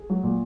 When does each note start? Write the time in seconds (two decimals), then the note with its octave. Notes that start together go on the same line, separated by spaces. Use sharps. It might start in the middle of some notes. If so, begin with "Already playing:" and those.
Already playing: G#4
0.10 F#3
0.23 A#2